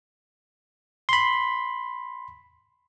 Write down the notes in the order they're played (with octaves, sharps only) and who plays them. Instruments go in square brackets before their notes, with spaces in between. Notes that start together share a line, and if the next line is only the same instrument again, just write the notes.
[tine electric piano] B5 C6